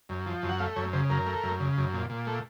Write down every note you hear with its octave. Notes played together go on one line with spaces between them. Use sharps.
F#2
F3
F#2
F#5
A3 F5
F#2 C#5
C#3 C5
F#2 A#4
A3
F#2
C#3
F#2
A#2
A#2
A3